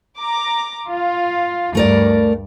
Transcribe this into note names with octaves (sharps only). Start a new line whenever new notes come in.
A#5 D6
F4
D2 G2 A3 A#4 D5